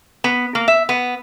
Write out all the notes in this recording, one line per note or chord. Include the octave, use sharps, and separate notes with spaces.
B3
A#3
E5
B3